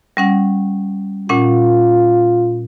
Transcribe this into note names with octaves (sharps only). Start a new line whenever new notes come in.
G3 C#4 F#5
A#2 C#4 F4 F#5